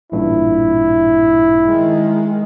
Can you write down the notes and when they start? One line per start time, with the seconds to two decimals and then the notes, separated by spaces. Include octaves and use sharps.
0.12 A1 G2 A#2 E4
1.63 D#3 G#3